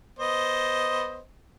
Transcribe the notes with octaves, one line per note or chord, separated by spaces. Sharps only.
B3 C5 D#5